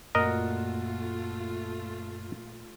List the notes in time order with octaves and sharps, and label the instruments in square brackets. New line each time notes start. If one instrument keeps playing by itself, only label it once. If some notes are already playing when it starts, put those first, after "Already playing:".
[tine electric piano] F#2 F#6 [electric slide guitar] A#2 F#4 [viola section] A3 F4 [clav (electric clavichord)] A#4 D#5